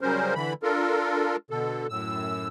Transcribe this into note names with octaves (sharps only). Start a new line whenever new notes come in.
C#3 F#3 G3 C#4 A#4 C5
D3 E3 B5
D4 F4 A4 A#4
B2 D3 A4
F#2 A2 E6